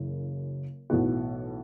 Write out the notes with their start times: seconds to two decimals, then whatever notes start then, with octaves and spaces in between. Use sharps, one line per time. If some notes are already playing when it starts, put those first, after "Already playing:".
Already playing: F#1 F#2 C#3 E3
0.90 B1 A2 E3 B3 F#4